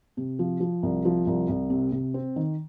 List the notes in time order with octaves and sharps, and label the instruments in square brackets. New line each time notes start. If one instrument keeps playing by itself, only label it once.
[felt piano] C3
F3
F3
C2
F3
C2
C2
C3
C3
C4
D#3